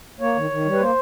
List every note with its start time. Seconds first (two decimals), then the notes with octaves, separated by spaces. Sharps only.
0.20 A#3 C#5
0.36 D#3
0.51 D#3
0.65 G3
0.73 B4
0.80 A#3 C5